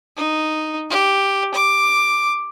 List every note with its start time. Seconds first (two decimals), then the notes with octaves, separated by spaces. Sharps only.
0.17 D#4
0.90 G4
1.55 D6